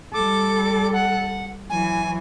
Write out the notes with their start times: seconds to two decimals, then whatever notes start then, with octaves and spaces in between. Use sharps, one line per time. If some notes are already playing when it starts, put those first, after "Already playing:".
0.14 G3 A4 D6
0.93 F#5
1.70 E3 F#3 G#5